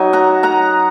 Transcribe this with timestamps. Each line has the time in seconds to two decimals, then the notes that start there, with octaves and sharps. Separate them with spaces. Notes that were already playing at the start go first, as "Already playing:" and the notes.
Already playing: F#3 D#4 D#5 G#5
0.13 F#5 A#5
0.43 F#5 A#5